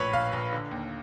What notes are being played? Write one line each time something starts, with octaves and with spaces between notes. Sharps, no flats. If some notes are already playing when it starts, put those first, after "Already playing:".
Already playing: A#1 A2 B4 C#5
A#1 F5
A#1
D3
D#2